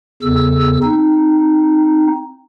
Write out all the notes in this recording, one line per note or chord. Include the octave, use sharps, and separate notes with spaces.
E2 C#3 A4 E6
C4 D#4